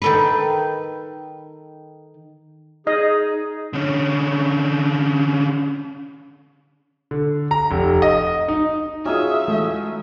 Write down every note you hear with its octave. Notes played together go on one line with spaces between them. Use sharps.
D#3 A4 B4
D#4 G#4 D#5
D3 C#4
D3
A#5
F1
D#5
D#4
C#4 D#4 F4 F#4 G#4 E5
E3 G#3 A3